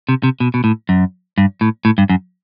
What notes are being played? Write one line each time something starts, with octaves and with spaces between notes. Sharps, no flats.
C3
C3
B2
B2
A2
F#2
G2
A2
A2
G2
F#2